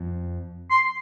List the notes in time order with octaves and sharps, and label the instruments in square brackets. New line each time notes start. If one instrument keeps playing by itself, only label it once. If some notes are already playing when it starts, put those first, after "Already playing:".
Already playing: [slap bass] F2
[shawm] C6